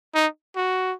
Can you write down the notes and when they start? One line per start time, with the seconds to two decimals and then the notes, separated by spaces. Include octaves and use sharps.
0.15 D#4
0.56 F#4